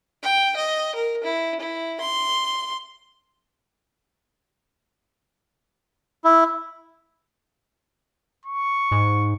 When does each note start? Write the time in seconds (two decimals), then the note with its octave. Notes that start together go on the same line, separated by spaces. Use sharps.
0.23 G5
0.56 D#5
0.95 A#4
1.24 E4
1.60 E4
2.00 C6
6.24 E4
8.45 C#6
8.92 G#2